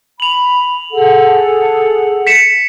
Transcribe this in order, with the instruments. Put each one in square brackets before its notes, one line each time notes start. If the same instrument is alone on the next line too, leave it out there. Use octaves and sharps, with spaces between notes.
[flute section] B5 [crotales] F7 F#7
[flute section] G#4 A4 F#5
[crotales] B6 C#7 E7